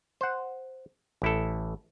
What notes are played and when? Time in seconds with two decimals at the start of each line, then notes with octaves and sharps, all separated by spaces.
0.21 C5 F#5
1.22 A1 E4 A4